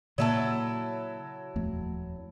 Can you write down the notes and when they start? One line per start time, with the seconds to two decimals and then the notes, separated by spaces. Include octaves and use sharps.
0.18 A#2 C#3 F#3 A#3 E4 A4
1.56 D#1 F2 A3